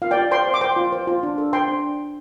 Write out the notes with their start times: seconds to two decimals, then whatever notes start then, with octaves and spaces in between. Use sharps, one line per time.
0.02 F4 F5
0.11 D5 G5
0.17 F4
0.31 C5 G5 C6
0.47 C5
0.54 D6
0.61 C5 G5 C6
0.76 F4
0.92 C5
1.07 F4
1.23 D4
1.38 A4
1.53 C5 G5 C6
1.68 D4